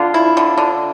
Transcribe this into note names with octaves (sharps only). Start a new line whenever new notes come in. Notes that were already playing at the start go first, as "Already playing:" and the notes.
Already playing: D3 F4
E4
D3
D3